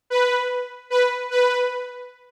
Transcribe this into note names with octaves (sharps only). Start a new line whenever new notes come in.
B4
B4
B4